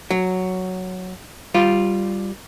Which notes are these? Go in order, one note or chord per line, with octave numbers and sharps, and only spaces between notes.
F#3
G3 F4 G4